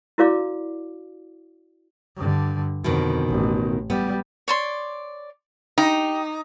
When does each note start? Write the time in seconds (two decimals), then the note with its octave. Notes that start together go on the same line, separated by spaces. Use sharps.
0.18 E4 F#4 A#4 D5 F5 D6
2.16 G2 D3
2.84 F2 B2 D3 D#3
3.28 A1
3.90 G3 B3
4.48 C#5 D5 C6
5.78 D#4 G4